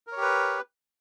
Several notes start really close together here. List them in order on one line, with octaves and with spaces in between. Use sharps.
A#4 C#5 G4 B4